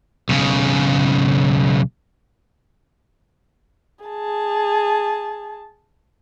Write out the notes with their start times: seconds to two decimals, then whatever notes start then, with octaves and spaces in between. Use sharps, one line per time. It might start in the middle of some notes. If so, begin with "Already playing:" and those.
0.29 B1 C#3
4.05 G#4 A5